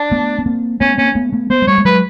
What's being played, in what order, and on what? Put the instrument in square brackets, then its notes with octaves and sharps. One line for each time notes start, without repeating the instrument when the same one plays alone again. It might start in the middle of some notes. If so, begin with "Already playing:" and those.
Already playing: [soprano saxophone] D4
[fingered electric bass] A3 B3
B3
A#3 C4
[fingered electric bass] A3 B3 [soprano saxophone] C#4
[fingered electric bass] A#3 C4 [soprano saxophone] C#4
[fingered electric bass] A3 B3
A3 B3
[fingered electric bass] A3 B3 [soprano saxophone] C5
[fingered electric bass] G#3
[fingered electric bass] G3 A3 [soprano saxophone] C#5
[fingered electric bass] A3
[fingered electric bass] F#3 G#3 [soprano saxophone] B4